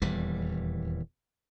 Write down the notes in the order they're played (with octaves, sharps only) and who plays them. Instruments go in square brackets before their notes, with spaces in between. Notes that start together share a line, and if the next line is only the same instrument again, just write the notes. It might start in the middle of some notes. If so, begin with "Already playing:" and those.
[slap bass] D#1 E2 E3 G3